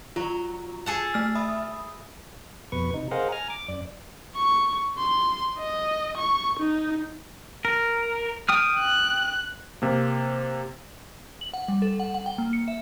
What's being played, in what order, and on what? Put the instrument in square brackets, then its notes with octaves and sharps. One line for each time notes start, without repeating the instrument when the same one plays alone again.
[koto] F#3 [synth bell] F4
[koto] G#4 A4 F#5
[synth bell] A3 F6
E5 B5 D#6
[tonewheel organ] F2 B2 B4 C#6
C3 D#4
G#4 A#4 C5 D#5 F5 F#5
G#5 A#5 F6
D6
F#2 D5
[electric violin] C#6
C6
D#5
C#6
D#4
[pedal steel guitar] A#4
G5 D#6 F6
[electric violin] F#6
[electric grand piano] C3 A#3
[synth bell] F#7
F#5
G3
A4
F#5
F#5
G5
A#3
C#7
E5